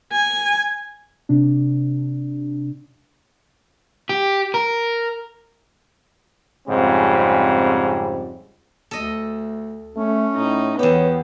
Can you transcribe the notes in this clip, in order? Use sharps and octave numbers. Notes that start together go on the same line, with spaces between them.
G#5
C3 D4
G4
A#4
F2 G#2 C#3 G3 C4
D2 A4 D#5
A3 C#4
A2 D#4
E2 B3 G4 C#5